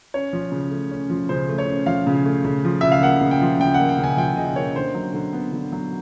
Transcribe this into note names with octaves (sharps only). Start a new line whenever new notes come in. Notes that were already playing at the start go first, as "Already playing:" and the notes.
C#4 C#5
F3
C#3
A3
C#4
F3
C#3 C5
A3
C#5
C#4
F3 F5
C#3
A3
C#3
F3
C#3 E5
F5
A#3 F#5
C#3
G5
F3
C#3 G5
F#5
A#3
G5
C#3
G#5
F3 G5
C#3 D#5
A#3 C#5
D3 C5
F#3
D3
B3
D3
F#3